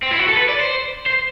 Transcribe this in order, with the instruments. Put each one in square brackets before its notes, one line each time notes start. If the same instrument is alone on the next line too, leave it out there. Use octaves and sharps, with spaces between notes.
[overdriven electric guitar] C4
E4
F#4
A4
B4
D5
C5
C5